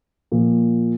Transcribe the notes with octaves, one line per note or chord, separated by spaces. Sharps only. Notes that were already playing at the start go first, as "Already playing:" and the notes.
A#2 F3